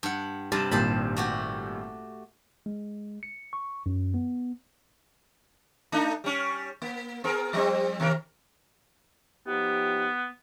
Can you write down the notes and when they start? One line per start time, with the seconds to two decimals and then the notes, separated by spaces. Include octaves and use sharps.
0.03 G2 F#5
0.52 G2 C3 G3 A5
0.71 G#1 A#2 G3 C5 A5 B5
1.17 A3 F#4 G4
2.66 G#3
3.23 C#7
3.53 C#6
3.86 F#2
4.14 B3
5.92 A3 D4 D#4
6.24 G3 C#4
6.82 A#3
7.24 B3 G#4 A#4
7.53 F3 G3 C4
8.00 D#2 C3 A#4
9.47 F3 B3 D#4 G4